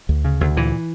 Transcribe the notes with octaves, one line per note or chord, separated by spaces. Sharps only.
D2
C#3
D2
A#2 E3